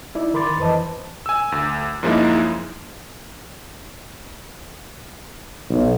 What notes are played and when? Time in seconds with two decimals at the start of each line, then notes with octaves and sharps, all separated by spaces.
0.15 D#4 E4 D5
0.34 D#3 A#4 B5 C6 D6 A6
0.58 F2 E3 B4 C5 D#5 A5
1.26 G#5 E6
1.52 D2
2.03 F#2 F3 G#3 A#3 D#4 E4
5.70 B1